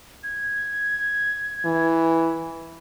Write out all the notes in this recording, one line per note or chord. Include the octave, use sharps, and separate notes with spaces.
G#6
E3